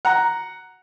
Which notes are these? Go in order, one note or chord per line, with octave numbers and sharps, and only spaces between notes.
F#5 A#5